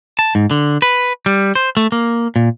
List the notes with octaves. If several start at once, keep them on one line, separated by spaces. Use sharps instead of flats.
A5
G#2
D3
B4
G3
C5
A3
A#3
A#2